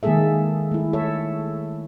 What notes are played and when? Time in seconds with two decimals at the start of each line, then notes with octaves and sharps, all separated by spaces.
0.03 D#3 G#3 A#3 G#4 A4 E5
0.71 A3 E4
0.93 A4 C#5 E5